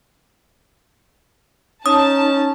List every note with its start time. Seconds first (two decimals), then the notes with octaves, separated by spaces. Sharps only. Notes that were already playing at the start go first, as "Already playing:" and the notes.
1.86 C#4 D#4 A5 D#6